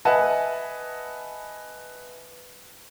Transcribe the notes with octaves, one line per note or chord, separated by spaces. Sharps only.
B4 D#5 E5 F#5 G#5 A5